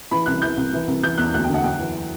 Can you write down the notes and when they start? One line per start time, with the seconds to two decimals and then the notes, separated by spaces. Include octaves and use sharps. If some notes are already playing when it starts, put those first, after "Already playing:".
0.11 E3 B5
0.26 C2 F#6
0.42 E3 G6
0.57 C2
0.73 E3
0.87 C2
1.03 E3 G6
1.18 E2 F#6
1.34 D2 F#6
1.44 D3 G5
1.54 F#5
1.64 F#2 G5
1.79 E3